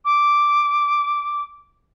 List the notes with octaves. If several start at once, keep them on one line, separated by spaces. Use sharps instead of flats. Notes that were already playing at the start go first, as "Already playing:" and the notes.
D6